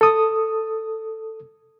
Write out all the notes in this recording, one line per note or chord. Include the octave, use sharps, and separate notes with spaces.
A4 D#6